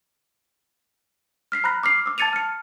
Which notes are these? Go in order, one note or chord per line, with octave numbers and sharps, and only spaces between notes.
F6 B6 C7
A#5 B5 F#6 A#6
D6 F6 C7
D6 E6
A5 G#6 A6 C#7 D#7 F7
F6 C#7